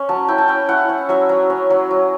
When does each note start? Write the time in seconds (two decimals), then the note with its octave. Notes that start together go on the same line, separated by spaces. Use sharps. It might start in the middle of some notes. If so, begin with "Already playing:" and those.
Already playing: C#4
0.09 F#3 A5
0.28 E4 G5
0.38 A5
0.48 C#4 G5
0.69 E4 F#5
0.89 C#4
1.09 F#3 E5
1.29 F#3
1.50 C#4
1.70 F#3
1.90 F#3